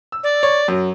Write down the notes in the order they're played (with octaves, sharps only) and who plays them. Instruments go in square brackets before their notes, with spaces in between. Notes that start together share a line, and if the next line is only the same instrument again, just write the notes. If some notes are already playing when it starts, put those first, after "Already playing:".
[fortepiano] E6
[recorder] D5
[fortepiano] C#5
F#2 F#3